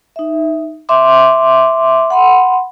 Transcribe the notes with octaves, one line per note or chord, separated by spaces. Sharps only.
D#4 E5
E5 C6 D6
F#5 B5 C6